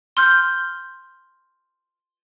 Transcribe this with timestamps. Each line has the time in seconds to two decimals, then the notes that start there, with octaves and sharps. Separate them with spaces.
0.17 C6 F6 G6